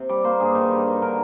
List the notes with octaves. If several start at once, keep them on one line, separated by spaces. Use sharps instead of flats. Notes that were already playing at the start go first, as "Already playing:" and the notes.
Already playing: C3
G3 D5
A#3 C5
G2 G#4
D#3
G3
D#3
D3 A#4